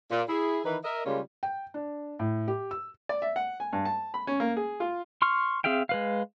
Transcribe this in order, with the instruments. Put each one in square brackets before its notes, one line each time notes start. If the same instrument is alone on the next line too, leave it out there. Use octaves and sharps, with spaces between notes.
[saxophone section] A#2
E4 G#4
D#3 E3 D#4 B4
A#4 D#5 E5
C#3 G3 G#3 A#3 C#4 F4
[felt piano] G5
D4
A2
G4
E6
[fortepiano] D5
E5
F#5
G#5
G2
A5
B5
C#4
A#3
G#4
F4
[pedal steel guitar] C6 C#6 F6
C4 G#4 E5 F5 G5
G#3 B4 F5